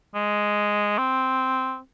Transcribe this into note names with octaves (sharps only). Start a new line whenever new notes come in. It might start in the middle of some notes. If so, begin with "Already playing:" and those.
G#3
C4